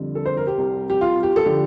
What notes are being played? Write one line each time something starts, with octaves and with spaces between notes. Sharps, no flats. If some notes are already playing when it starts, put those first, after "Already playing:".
Already playing: F2 D3 G3
A4
C5
A#4
G4
C2 C3 G3
G4
F4
G4
A4
D3 F3 G4